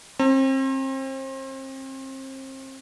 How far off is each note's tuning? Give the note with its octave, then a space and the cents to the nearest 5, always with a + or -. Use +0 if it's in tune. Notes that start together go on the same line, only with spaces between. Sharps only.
C4 +35 A5 +45